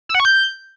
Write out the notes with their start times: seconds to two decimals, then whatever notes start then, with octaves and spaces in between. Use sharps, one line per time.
0.09 E6
0.15 F#5
0.20 C#6
0.25 G6